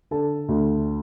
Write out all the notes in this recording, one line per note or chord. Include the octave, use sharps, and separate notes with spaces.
D3 A4 A5
D2